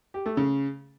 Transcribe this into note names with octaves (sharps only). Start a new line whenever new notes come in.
G4
A3
C#3